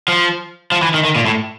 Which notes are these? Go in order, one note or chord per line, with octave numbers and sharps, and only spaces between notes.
F3
F3
E3
D#3
D#3
A#2
A2